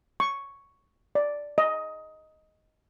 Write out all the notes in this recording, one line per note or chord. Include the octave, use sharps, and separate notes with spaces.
C#6
D5
D#5